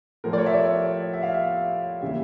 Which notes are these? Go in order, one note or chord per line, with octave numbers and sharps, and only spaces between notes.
A2 F3 A3 A#4
D5
C#5
E5
D5
E5
F5
E5
C#3 E3 G3 A#3 E5